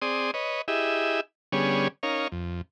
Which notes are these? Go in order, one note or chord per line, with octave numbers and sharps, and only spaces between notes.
C4 G#4 D5 C6 D#6
B4 C#5 D#5
E4 G4 G#4 D#5 E5
D3 G3 B3 C#4 G#4 C#5
C#4 D#4 A#4 C#5 F5
F2